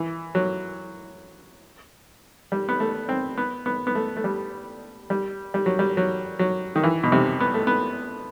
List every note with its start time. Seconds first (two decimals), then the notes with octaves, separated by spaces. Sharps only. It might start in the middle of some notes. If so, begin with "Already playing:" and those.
Already playing: E3
0.35 F#3
2.52 G3
2.69 B3
2.80 A3
3.09 C4
3.37 B3
3.66 B3
3.87 B3
3.95 A3
4.17 A3
4.24 G3
5.10 G3
5.54 G3
5.66 F#3
5.79 G3
5.97 F#3
6.39 F#3
6.76 D#3
6.83 E3
7.03 B2
7.12 C3
7.40 B3
7.54 A3
7.67 B3